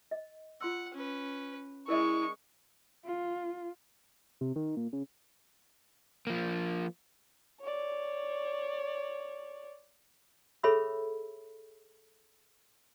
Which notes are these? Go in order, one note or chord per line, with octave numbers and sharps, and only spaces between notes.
D#5
F4 F#5 C6 E6
C#4 B4
G#3 E4 A#4 D5 D#5 C#6
F4
C3
D#3
A#2
C#3
F3 A#3
C#5 D5
G#4 A4 C#5 E5 B5 E6